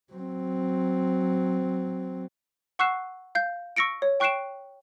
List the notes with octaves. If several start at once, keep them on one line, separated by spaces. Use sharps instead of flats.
F#3 C4
F#5 C#6 E6 F#6 C7 E7
F5 G6
C#6 E6 A#6 C#7 D7
C#5
G5 C#6 F#6 C7 D7 E7